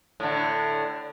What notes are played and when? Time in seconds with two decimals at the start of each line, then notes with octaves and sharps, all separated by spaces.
0.20 A2 D3